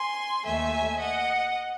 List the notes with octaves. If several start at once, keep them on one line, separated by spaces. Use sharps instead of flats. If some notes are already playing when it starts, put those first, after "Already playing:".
Already playing: G#5 C6
D#2 D#3 A3 E5 G#5
D#5 F#5